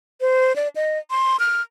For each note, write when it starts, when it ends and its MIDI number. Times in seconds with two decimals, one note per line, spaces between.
0.21 0.55 72
0.56 0.68 74
0.76 0.99 75
1.11 1.39 84
1.40 1.62 89